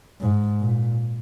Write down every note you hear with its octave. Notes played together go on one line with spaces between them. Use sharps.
G#2
A#2